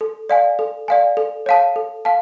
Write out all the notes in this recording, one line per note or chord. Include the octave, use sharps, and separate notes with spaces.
A4
D5 F5 G#5
A4
D5 F5 G#5
A4
C#5 F5 A5
A4
F5 A5